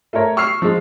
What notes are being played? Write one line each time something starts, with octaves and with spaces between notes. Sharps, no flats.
A3 A4 A#4 C#5
C#6 E6 F6 C7
F3 G#3